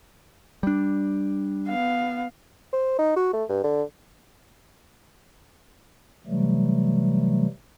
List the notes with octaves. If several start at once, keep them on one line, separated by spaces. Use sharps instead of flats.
G3 D4
B3 F5
C5
D#4
F#4
A3
G2
D3
C3 E3 F#3 G3 A3